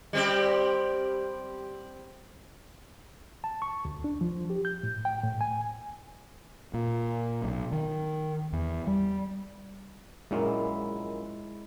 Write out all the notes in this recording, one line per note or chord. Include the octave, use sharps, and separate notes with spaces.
G3 C4 G4
A5
C#6
D2
D4
F3
G4
G6
A2
G5
A2
G#5
A#2
B1
D#3
E2
G3
A#1 F#2 A#2 G#3 E4